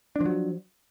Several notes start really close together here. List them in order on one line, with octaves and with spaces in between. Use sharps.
D4 F3 F#3